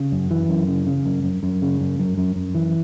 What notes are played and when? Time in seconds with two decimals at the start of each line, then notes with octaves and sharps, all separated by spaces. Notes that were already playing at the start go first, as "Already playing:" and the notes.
Already playing: C#3
0.12 F#2
0.31 E3
0.49 F#2
0.68 C#3
0.87 C#3
1.06 F#2
1.24 F#2
1.43 F#2
1.62 C#3
1.80 F#2
1.99 F#2
2.17 F#2
2.36 F#2
2.55 E3